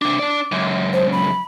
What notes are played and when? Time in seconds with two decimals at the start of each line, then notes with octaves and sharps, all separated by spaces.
0.02 C3 D4 D6
0.19 D4 D5
0.52 C#2 F#2
0.93 C5
1.12 B5